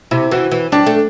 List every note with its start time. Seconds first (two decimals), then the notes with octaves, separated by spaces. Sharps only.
0.11 C3 E4
0.31 E3 F#4
0.51 E3
0.72 G3 D4
0.86 A3